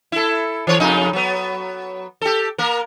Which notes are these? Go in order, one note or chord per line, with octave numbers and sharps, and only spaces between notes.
E4 A4
E3 C#5
F2 C#3 D#4
F#3 B3
G4 A4
A#3 A#4